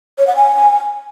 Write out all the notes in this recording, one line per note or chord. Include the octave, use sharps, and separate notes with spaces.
C#5
F#5
G#5